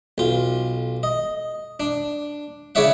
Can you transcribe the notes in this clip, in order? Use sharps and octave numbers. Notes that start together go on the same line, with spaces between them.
B1 F4
D#5
D4
C#3 E4 C#5 D5 E5 F#5